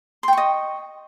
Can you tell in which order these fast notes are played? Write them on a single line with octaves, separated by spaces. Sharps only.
C6 G5 C#6 D#5